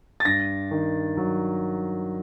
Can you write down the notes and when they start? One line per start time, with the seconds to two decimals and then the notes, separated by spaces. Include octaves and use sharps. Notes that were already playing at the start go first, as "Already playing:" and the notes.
0.20 A6
0.25 G2 A#6
0.71 D#3
1.17 F#3